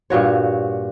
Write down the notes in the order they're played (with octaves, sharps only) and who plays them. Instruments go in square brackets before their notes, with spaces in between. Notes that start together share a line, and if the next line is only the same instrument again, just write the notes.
[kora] G2 A#2 F#4 C#5